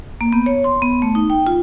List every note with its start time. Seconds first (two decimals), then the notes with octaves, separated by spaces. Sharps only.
0.21 A#3
0.33 B3
0.46 C#5
0.64 C6
0.82 B3
1.02 A3
1.15 D#4
1.30 G5
1.47 F4